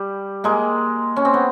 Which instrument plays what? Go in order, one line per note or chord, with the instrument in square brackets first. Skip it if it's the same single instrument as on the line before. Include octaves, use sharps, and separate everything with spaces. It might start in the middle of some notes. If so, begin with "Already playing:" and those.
Already playing: [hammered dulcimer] G3
G#3 A#3
C#4
C4
B3